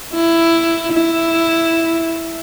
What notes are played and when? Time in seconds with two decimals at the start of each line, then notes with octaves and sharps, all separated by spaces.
0.14 E4
0.93 E4